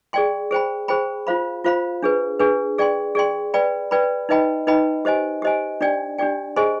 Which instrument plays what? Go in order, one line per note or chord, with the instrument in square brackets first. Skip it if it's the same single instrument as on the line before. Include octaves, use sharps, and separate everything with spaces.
[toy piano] G#4 D5 G5 C6
G#4 C5 G5 B5
G#4 C5 G5 B5
F4 C5 F5 B5
F4 C5 F5 B5
D4 G#4 B4
D4 G#4 B4
G#4 D5 G5 C6
G#4 D5 G5 C6
B4 D5 G5 B5
B4 D5 G5 B5
D#4 B4 D#5 G5 B5
D#4 B4 D#5 G5 B5
G4 C5 D#5 G#5
G4 C5 D#5 G#5
D4 G4 D5 G5
D4 G4 D5 G5
G#4 C5 D#5 G#5 C6